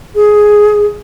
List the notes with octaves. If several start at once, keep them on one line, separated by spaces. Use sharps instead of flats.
G#4